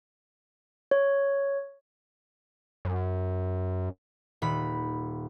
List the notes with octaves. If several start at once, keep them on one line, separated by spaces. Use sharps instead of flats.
C#5
F#2
D#1 B5